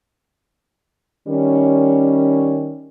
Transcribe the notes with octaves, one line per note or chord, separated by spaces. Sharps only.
D#3 G3 C#4